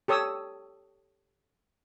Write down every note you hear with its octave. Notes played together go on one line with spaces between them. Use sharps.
G4 A4 C#5 D#6 E6